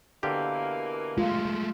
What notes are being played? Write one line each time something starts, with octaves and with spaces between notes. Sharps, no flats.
B2 D3 E3 A#3 G4
G#3 A3 F4